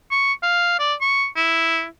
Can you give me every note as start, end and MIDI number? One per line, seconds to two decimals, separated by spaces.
0.11 0.33 85
0.43 0.76 77
0.79 0.93 74
1.01 1.26 85
1.36 1.85 64